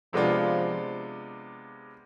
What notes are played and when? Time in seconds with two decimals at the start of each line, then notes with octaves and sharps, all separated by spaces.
0.13 C3 F3 G#3 B3 D4 F4